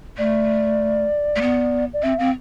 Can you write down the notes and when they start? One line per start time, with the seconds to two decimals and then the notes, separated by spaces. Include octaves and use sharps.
0.18 A3 D5
1.36 A3
1.41 B3
1.93 D5
2.03 C4 E5
2.18 C4 F5